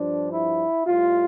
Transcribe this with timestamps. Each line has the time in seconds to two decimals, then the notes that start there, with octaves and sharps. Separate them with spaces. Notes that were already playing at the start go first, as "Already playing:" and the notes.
Already playing: G2 F3 D4
0.30 E4
0.86 A2 G3 F4